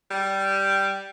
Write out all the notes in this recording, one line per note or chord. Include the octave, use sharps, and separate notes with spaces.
G3